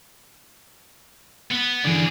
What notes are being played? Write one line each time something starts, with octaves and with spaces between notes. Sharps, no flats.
B3
D3 E3 D4 G#4 D5